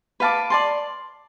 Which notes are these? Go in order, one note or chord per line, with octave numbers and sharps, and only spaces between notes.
B4 F5 A5 D6
D5 A5 C6